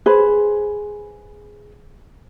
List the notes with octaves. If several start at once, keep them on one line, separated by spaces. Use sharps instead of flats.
G#4 B4 C5